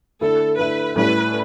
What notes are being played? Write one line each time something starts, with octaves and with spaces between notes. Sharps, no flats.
D3 A3 E4 A4
D3 A3 E4 B4
A2 G3 C#4 E4 B4